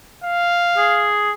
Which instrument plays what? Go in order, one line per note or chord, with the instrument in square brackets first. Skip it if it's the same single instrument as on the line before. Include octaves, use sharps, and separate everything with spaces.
[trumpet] F5
[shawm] G#4